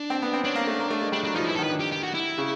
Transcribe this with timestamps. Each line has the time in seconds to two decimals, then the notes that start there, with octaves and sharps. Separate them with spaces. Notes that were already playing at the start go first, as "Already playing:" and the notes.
Already playing: D4
0.10 C4
0.22 B3
0.33 C4
0.45 C#4 D4
0.55 A#3
0.67 A3
0.79 A#3
0.90 A3
1.01 G#3
1.12 G3 D4
1.24 F#3 D4
1.35 F3 D#4
1.47 E3 E4
1.55 A4
1.59 D#3
1.64 B4
1.70 D3
1.80 G4
1.92 G4
2.03 F#4
2.14 E4
2.38 C#3